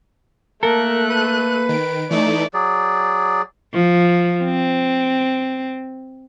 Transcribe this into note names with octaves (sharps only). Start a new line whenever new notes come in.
A3 A#3 A4 A#4 F#6
B4 D#7
D#3 D7
E3 A3 D#4 D5
F#3 G#4 D5
F3
C4